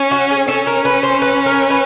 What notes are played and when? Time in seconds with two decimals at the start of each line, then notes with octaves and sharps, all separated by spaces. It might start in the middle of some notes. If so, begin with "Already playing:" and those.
Already playing: C#4
0.11 F#4
0.31 G#4
0.48 C#4 A4
0.67 A#4
0.85 B4
1.03 C5
1.22 B4
1.46 A#4
1.70 B4